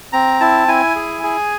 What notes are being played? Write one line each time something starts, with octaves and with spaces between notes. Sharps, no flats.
C4 A#5
E4 A5
E4 G#5
G#4
G#4